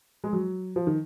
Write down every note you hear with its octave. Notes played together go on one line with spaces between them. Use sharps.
G#3
F#3
F3
D#3